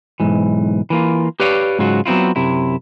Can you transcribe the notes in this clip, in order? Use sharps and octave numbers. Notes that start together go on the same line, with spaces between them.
B1 G#2 E3
E3 A#3 F4
G4 B4 C#5 D5 F5
G#2 C#3 F#3 F4 F#4
F#3 B3 C4 E4 F4
F#2 C3 E4